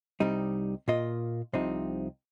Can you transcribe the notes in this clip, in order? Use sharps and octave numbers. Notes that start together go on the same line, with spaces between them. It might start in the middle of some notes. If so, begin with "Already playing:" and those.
C2 C3 G3 C4 D#4
A#2 A#3 F4 D#5
C2 C3 F3 C4 D#4